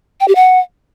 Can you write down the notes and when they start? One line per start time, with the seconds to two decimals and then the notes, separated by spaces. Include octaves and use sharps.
0.20 G5
0.28 G4
0.36 F#5